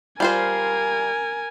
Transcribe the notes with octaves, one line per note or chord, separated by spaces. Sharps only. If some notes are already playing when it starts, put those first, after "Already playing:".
G3 F4 A#4 C5 G#5